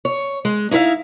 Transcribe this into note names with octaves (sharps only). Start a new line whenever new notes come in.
C#5
G#3
D#4 E4 B4 E5 F5